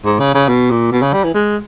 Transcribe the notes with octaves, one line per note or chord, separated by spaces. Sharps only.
G#2
C#3
C#3
B2
A#2
B2
C#3
G3
E3
G#3